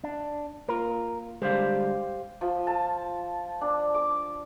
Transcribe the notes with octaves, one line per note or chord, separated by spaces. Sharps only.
D4
A#3 F4 A#4
D3 G3 G#3 G4 C5 F5
F3
A5
D4
D6